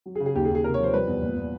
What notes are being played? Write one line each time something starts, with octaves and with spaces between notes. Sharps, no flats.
F#3
G#4
C#3
G#4
D#2 G4
G#4
D#2
G#4
C3 A#4
C#5
F3 C5
G3 B4
E2
A#2
A#2